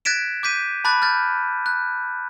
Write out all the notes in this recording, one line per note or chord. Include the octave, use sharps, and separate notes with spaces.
F#6 G#6 A6 B6 D7 E7
D6 G6 B6 D#7
A5 B5 D6 F#6 A6
F6 G6 A6
F#6